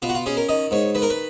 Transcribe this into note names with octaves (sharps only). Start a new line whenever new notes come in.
B2 F4
F#4
F4
C#4 G#4
A#4
D#3 D#5
G#2 C#5
D#3 B4
A#4
B4